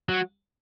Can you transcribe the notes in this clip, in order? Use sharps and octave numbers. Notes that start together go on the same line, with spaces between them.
F#3